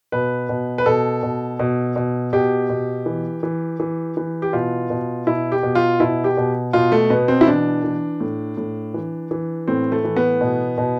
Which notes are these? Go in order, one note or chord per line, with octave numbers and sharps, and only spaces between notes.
B2 B4
B2
B4
B2 A4
B2
B2
B2
B2 G4
B2
E3
E3
E3
E3
G4
B2 F4
B2
B2 E4
G4
B2
F4
B2 E4
G4
B2
B2 F4
A3
B2 B3
C4
E4
E3 D4
E3
A2
A2
E3
E3
A2 C4
A3
E3
B3
B2
B2